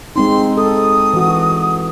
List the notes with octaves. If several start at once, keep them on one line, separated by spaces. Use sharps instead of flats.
G#3 C4 D#4 C6
A4 D#6
E3 F#4